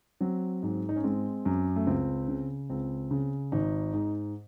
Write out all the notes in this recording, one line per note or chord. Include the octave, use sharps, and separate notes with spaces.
F#3 C4
G#2
D#4
C#4
G#3 C4
F#2
A3
C#2 C4
C#3
C#2 C4
C#3
G#1 D#4
G#2